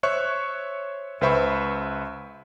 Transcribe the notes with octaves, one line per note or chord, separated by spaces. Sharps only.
C5 C#5 E5 C#6 F#6
C#2 B4 C5 E5 B5 C#6